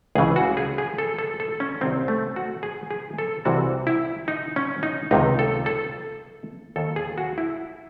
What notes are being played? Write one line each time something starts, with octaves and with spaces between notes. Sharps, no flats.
C#2 C#3 E3 G#4
F#4
G#4
G#4
A4
A4
A4
C#4
C2 C3 D#3 C4
A3
F#4
G#4
G#4
A4
C2 C3 E3 F#4
E4
D#4
C#4
D#4
C#2 C3 D#3 D#4
A4
A4
D#2 D#3 A4
G#4
F#4
E4